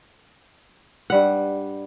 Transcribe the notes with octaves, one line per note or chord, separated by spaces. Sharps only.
G2 G3 F#5